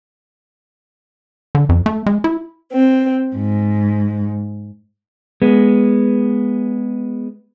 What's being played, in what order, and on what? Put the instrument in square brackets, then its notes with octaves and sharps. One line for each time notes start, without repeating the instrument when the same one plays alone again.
[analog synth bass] D3
F2
A3
G#3
E4
[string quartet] C4
G#2
[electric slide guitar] G#3 B3